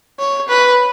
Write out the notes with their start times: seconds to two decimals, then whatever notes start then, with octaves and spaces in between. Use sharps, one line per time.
0.19 C#5
0.49 B4